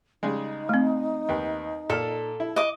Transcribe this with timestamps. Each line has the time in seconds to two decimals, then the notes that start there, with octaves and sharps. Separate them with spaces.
0.23 C#3 G3 G#3 D#4
0.69 A3 C4
1.29 D#2 B4 G5
1.90 A#2 A4 F6
2.40 E4
2.56 D#5 D6